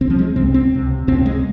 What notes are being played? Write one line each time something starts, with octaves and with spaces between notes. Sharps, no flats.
C2 C3 C4
F3
G#3
C2 C3 C4
C4
C#2 C3
C#2 C3 C4
G#3